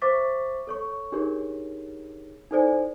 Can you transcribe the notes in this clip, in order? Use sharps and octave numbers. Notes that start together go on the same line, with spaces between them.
C5 E5 C#6 D6 A6 B6
A4 C#5 C#6
D4 D#4 G4 G#4 A#4 C#5
D#4 E4 A4 C5 D5 G#5